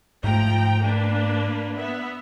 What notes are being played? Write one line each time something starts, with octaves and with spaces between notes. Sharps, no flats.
G#2 F3 A3 G5 A#5
A#3 D4 B4
B3 E5